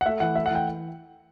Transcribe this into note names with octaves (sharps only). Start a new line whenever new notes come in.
F#5
A3 E5
E3 F#5
A3 E5
F#5
E3
G5